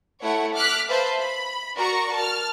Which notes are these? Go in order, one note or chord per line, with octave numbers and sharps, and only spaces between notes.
A3 E4 C#5 F#5
D6 F6 F#6 B6
B4 C5 E5 F5 A5 B5
B5
F#4 A#4 D5 A#5 C#6
A5 F6